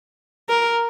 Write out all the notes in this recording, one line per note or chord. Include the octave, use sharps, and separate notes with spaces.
A#4